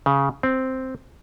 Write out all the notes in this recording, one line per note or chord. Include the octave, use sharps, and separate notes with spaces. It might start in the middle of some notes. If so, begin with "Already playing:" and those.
C#3
C4